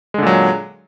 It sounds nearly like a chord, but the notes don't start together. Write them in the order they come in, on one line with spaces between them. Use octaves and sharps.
G#3 D3 A#2 F#3